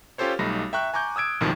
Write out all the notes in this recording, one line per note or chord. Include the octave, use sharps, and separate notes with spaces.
C#4 F4 G4 A4 C5 C#5
B1 G3 A3 D#4 B5 A#6
E5 G5 A#5 C#6 F#6
G#5 A#5 C#6 D6 G6
D#6 E6 G#6 D7
A#1 F#2 A2 C3 D#3 F3